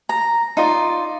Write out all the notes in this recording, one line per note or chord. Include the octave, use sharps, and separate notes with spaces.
A#5
D#4 F4 D5